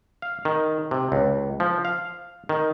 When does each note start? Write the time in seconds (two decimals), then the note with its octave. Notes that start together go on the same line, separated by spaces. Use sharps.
0.22 F5
0.45 D#3
0.91 C3
1.12 C#2
1.60 F3
1.85 F5
2.49 D#3